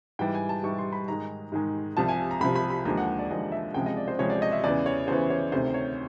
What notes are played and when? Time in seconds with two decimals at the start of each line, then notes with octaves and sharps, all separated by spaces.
0.19 G#2 E3 G3 G5
0.34 G#5
0.49 A5
0.63 G#2 E3 G3 C#6
0.78 C6
0.92 B5
1.08 G#2 D#3 G#3 A#5
1.52 G#2 D#3 G#3
1.97 C2 C3 F3 A5
2.08 G#5
2.31 A#5
2.41 C2 C3 F3 B5
2.55 B5
2.70 B5
2.85 D#2 D3 F3 G#3 A#5
2.97 F#5
3.19 D5
3.30 D#2 D3 F3 G#3 D#5
3.52 E5
3.74 C#2 C3 F3 G#3 G5
3.86 D#5
3.97 D5
4.08 C5
4.19 C#2 C3 F3 G#3 C#5
4.30 D5
4.42 D#5
4.52 E5
4.64 E2 C#3 E3 D5
4.86 C#5
5.08 E2 C#3 E3 C5
5.30 C#5
5.52 D2 C3 D#3 C5
5.74 C#5